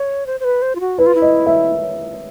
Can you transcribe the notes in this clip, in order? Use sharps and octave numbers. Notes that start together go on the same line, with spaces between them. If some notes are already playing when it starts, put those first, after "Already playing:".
Already playing: C#5
C5
C5
B4
C5
F4
F#4
E4 B4
F4
E4
D#5
E5